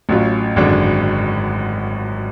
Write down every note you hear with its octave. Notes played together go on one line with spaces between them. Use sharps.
A1 A2 F#3 C#4 F4
G#1 F#2 D3 G#3 D4